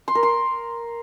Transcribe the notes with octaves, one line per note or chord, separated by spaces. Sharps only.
C6
A#4
C6